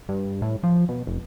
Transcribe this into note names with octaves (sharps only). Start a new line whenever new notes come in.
G2
A2
F3
B2
F1